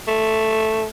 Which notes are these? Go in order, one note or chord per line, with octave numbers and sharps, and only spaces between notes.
A3